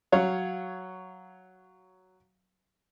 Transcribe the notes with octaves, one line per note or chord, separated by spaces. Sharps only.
F#3 C#5 F5